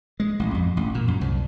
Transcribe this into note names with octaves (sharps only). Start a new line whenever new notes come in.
G#3
A1
F2
A1
A#2
F#2
C2